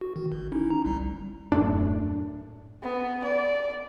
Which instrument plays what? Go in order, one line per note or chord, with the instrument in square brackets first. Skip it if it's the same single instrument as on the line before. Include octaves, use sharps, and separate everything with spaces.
[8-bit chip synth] F#4
D#3
G1
C#4 D#4 E4
A#5
G1 C2 G3
[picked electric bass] D#1 F#2 A2 D4
[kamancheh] B3
D5